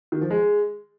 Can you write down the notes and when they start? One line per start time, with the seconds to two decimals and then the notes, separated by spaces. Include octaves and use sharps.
0.12 D#3
0.21 F3
0.31 G#3